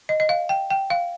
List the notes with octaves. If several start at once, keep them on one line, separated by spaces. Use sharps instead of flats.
D#5
D#5
F5
G5
G5
F5